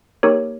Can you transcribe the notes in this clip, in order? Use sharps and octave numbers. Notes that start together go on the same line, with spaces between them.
A#3 D#4 G4 A#4 C#5